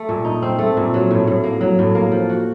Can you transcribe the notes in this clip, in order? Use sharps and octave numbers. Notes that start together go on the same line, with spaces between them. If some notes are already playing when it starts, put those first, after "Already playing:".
Already playing: A3
A#2
D#4
C4
A3
A#2
F#3
A2
A2
A#3
F#3
A2
A#3
F3
F#4